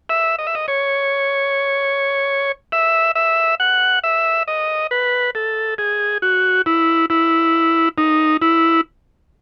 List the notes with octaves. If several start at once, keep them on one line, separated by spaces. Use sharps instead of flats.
E5
D#5
E5
D#5
C#5
E5
E5
F#5
E5
D#5
B4
A4
G#4
F#4
E4
E4
D#4
E4